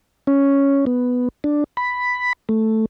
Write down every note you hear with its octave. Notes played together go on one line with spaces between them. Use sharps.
C#4
B3
D4
B5
A3